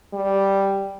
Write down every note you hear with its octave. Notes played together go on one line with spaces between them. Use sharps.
G3